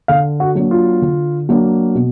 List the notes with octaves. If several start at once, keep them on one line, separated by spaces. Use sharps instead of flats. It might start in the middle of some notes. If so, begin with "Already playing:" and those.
D3 F5
F#4
F#3 A#3 D4
F4
D3
F#3 A#3 D4
B2